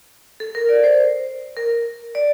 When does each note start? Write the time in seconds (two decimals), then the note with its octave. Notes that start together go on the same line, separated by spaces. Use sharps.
0.40 A4
0.55 A#4
0.69 D5
0.84 C5
1.57 A#4
2.15 D5